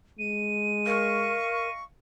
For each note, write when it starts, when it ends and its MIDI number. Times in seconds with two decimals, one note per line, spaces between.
0.19 1.37 56
0.19 1.72 99
0.86 1.68 70
0.86 1.83 75
0.86 1.83 77
0.86 1.83 85